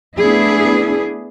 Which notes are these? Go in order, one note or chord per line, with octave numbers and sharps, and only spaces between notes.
A3 B3 D4 E4 G#4